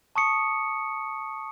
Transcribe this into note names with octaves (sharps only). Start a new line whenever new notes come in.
A5 C#6 D#6 C#7